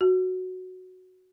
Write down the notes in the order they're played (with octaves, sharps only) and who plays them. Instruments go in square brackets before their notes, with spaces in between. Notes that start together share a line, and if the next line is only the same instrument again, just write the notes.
[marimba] F#4